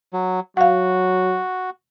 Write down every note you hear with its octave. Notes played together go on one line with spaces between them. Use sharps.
F#3
F#3 F#4 F5 F#5